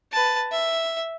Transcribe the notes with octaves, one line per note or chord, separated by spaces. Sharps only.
B4 A5
E5